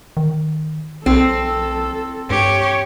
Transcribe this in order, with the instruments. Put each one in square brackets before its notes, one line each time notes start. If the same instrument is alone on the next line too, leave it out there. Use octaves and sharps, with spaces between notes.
[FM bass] D#3
[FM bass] B1 [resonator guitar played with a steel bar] C4 [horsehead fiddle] A4
[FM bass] G2 [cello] G4 C#5